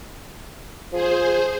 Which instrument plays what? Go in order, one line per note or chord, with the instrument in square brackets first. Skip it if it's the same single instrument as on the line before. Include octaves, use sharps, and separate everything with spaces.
[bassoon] F3 [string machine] G#4 C5